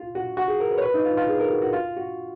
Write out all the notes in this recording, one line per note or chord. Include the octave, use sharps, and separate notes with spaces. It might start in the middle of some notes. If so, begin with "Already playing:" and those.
Already playing: F4
F#4
F#4
G#4
A#4
B4
C#5
B4
D#4
F4
F4
G#4
A#4
F#4
F#4
F4
F#4